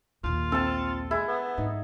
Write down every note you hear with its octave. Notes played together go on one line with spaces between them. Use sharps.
A#1 D#2 F4
C4 A4 A5
G#3 E4 G#4
B3
G#2 D#4